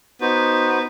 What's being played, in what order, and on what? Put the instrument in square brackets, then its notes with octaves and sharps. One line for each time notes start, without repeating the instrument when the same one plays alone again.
[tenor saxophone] B3 [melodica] D#4 F#4 C5